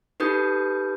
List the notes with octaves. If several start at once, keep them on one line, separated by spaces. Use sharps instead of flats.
D#4 G4 A4 B4 D#6 G6